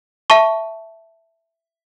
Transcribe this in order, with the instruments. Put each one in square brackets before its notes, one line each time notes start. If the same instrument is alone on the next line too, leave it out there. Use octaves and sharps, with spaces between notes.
[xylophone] E5 A5 C#6